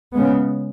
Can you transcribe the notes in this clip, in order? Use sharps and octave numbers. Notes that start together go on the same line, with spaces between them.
C#3 G#3 B3